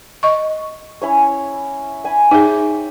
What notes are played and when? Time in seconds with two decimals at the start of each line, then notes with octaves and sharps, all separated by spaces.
0.23 D#5 C#6
1.02 C#4 E4 C#5
2.04 G#5 B5
2.31 D#4 G#4 C#5 E5 G5